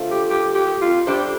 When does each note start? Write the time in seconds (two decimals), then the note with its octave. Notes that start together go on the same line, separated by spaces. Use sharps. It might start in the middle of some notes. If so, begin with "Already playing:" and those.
Already playing: D3 A3 F4 C5
0.11 G4
0.30 G4
0.55 G4
0.81 F4
1.07 G3 D4 G4 A4 C5